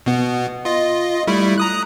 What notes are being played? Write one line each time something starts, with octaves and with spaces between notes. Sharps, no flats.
B2 B3
F4 D#5
G3 A3 E4
A#5 D#6 F#6